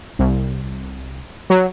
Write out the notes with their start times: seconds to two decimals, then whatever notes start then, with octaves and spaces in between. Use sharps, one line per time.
0.19 C2
1.50 F#3